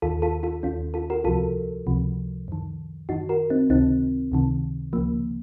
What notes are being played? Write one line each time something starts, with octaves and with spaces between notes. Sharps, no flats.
D#2 D#3 F4 A4
F4 A4
F4 A4
D#2 D#3 C#4 F4
F4 A4
F#4 A#4
C#2 C3 F3 F4 A4
C#2 C3 F3
F#2 D#3
F#2 D#3 D#4 F#4
F#4 A#4
C4 D#4
C#2 C3 D#3 C4 D#4
C#2 C3 D#3
C#2 C#3 F3 A#3